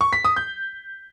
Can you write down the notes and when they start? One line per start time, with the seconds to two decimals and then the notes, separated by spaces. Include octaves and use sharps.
0.01 C#6
0.13 B6
0.25 D#6
0.36 G6